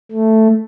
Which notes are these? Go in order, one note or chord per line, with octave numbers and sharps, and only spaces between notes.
A3